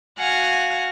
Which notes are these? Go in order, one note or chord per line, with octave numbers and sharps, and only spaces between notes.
F#4 F5 F#5 G#5